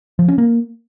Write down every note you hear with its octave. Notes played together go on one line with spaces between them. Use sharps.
F3
C#4
A#3